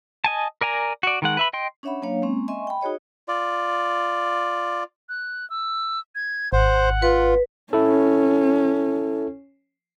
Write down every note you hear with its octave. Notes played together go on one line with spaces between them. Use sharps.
D#5 G#5 A5
A#4 D5 G#5 A#5
F#4 D5
D#3 G#3 F#5
B4 E5 B5
D#5 G5 C6
C#4 D4 C#5 E5 F#5 B5
F#3 A#3 D4 C#5 F5
G#3 A#3 C4 C#4
D#5 E5 G#5 C6 C#6
G5 B5
D#4 F#4 G#4 C#5 D#5
F4 D5
F#6
E6
G#6
G#1 C5 F#5
F4 B4
C#4 E4 A4